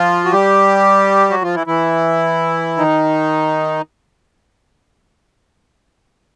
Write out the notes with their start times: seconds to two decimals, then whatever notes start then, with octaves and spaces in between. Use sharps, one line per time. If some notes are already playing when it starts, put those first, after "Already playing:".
Already playing: F3 F4
0.25 F#4
0.32 G3 G4
1.30 F#3 F#4
1.42 F3 F4
1.54 E3 E4
1.67 E3 E4
2.77 D#3 D#4